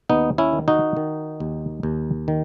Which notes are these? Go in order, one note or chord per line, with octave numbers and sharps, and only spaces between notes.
D#2 B3 D#4
C#4 E4
D#3
D#4 F#4
D#3
D#2
D#2
D#3